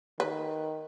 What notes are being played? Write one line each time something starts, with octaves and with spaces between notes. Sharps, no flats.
D#3 B4